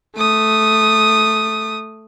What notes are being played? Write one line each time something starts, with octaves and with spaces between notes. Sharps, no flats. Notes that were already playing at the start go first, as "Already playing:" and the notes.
A3 D#6